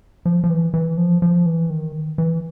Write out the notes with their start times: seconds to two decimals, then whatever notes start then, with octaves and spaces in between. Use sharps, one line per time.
0.25 F3
0.44 F3
0.50 E3
0.74 E3
0.98 F3
1.22 F3
1.46 E3
1.70 D#3
2.18 E3